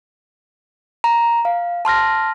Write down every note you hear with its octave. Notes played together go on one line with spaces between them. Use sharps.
A#5
F5
A5 C6 F6 A#6